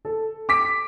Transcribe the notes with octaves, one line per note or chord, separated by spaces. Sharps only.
A4
D6 B6 D7